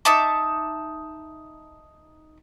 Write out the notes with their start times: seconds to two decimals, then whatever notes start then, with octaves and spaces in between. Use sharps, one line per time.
0.05 D#4 E5 A5 D6